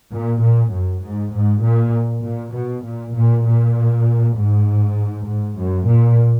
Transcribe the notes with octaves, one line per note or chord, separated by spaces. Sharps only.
A#2
A#2
F#2
G#2
G#2
A#2
A#2
B2
A#2
A#2
A#2
G#2
G#2
F#2
A#2